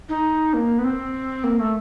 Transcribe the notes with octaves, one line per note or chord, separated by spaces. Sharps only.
D#4
A#3
B3
C4
A#3
A3